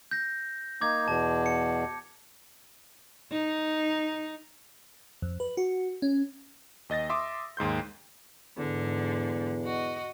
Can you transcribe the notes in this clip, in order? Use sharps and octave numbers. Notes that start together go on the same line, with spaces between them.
G6 A#6
A#3 D#4 D6 G#6
E2 B2 A5
C#7
D#4
F2
B4
F#4
C#4
D#2 D#5 A6 A#6
E5 C6 D6 D#6
D#2 G#2 C6 G6
E2 G#2 D3
F#4 D#5